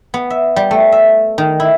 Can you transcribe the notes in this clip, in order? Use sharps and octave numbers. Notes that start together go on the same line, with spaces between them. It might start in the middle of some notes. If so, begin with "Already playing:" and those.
B3
E5
G3
A3
E5
D#3
E4